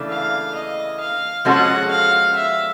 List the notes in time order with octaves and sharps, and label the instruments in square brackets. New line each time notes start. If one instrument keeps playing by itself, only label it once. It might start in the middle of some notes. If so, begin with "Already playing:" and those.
Already playing: [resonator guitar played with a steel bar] C#3 E3 A3 D4
[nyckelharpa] F5
D#5
F5
[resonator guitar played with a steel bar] F3 G#3 C#4 F#4 A4 [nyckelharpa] F#5
[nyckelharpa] F5
E5